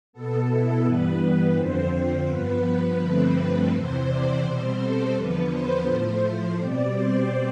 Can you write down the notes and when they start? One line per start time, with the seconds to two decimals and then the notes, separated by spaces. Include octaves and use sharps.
0.13 B2 B3 A4
0.49 E4
0.84 G2 E3 G3 B3 B4
1.56 F2 D3 F3 C4 C5
1.92 C5
2.28 G2 F3 B3 B4
2.99 G2 D3 F3 A3 C4 B4
3.71 E2 C3 E3 C5
4.07 D5
4.42 B2 G3 C4 C5
4.79 A4
5.14 E2 D3 F3 B3 B4
5.50 C5
5.86 A2 F3 A3
6.57 B2 G3 C4 D5
6.93 C5